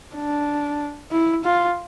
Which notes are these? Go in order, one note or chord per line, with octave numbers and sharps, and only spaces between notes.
D4
E4
F4